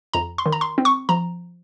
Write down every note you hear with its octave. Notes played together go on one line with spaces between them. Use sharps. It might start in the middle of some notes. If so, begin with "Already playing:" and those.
F2 A#5
C6
D#3
A#5
C6
C4
C#6
F3 A#5